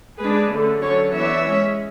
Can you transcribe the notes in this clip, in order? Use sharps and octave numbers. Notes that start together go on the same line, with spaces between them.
G#3 D4 G#4 B4
D3 A3 C#4
D3 F#3 C#4 A4 C#5
E3 B3 D4 C#5 E5
G#3 C#4